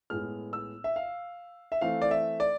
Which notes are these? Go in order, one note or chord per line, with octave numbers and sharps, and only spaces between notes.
A2 G#3 B3 F6
E6
E5
F5
E5
E3 A3 C4 F5
D5
E5
D5